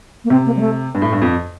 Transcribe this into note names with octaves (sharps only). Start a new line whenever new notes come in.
A#3
C3 C4
A#3
G3
A3
G2
A2
G2
F2